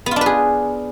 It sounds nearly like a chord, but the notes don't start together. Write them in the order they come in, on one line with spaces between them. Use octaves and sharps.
B3 F4 D4 B4 G#4